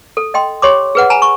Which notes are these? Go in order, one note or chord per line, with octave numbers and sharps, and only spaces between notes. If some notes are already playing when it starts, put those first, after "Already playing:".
A4
D#5 G5 C6
G4 C#5 C6 D6
G#4 B4 F#5
G#5 A#5 B5
C#6